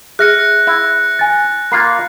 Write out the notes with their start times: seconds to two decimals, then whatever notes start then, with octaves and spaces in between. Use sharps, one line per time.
0.19 G#4 E5 F6 F#6 A#6 C#7
0.67 E4
1.19 G#5 A6
1.72 A#3 F4 B5 C7